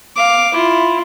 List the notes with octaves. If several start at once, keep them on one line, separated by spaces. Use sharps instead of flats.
F5 D6
E4 F4